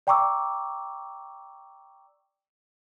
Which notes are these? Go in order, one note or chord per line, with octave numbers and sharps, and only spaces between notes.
D5 G5 A#5 C#6 D6 E6